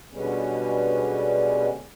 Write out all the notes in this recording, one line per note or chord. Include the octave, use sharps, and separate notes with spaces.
B2 D3 G3 G#3 B3 C#4